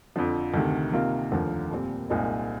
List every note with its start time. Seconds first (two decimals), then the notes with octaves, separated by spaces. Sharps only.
0.16 F2 D3 F3
0.54 D2 C3 D#3
0.93 C3 D#3 A#3 F4
1.31 F1 D#2 D3 F3 A#3
1.71 A#2 G3 C4
2.10 C2 A#2 G#3 C4 D#4